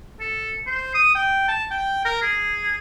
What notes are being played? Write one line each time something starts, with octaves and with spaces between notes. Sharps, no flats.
A4
C5
D#6
G5
A5
G5
A#4
G#4